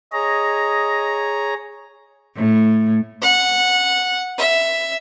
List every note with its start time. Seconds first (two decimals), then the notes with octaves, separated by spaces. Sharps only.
0.13 G#4 C#5 D#5 A#5
2.36 A2
3.22 F#5
4.38 E5